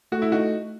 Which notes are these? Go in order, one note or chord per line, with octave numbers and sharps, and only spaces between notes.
A3 F#4
E4
D#4 F#4